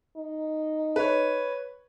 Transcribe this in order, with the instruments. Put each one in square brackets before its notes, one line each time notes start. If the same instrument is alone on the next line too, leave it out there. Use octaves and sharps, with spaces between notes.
[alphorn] D#4
[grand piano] B4 C#5